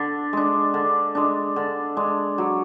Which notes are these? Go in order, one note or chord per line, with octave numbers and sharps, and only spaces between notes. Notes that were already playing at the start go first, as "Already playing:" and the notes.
Already playing: D3 D4
G#3 D4
D3
G#3 D4
D3
G#3 D4
F#3